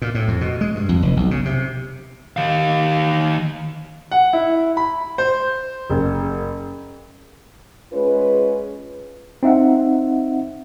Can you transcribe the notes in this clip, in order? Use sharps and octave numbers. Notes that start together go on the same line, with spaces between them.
A#2
A2
F2
B2
G#3
G2
F2
F1
B1
C#3
C3
D#3 F5
F#5
E4
B5
C5
F#1
G#3 C#4 F4 G#4 B4
C4 D#4 E5 F#5